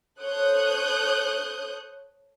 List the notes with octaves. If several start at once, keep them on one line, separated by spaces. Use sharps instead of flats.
A4 C5 C#5 D#6 F#6 G6